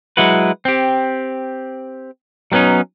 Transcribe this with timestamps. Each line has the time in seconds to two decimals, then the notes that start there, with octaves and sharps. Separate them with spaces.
0.17 F#3 G#3 E4 F#4 B4
0.65 C4 G4
2.52 F#3 G3 B3 C#4 D#4